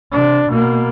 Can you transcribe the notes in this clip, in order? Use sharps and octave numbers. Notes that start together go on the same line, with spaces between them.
C3 D4
B2 A#3